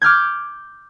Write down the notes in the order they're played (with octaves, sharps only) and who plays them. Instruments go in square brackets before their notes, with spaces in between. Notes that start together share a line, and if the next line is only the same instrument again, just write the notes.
[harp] D6 F6 G6 G#6